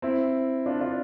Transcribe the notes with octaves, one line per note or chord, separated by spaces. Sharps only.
C4 E4
D4 F4
D4 F4